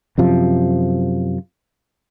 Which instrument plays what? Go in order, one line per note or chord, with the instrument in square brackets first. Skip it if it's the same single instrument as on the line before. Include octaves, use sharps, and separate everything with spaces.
[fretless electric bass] F#2 C3 F3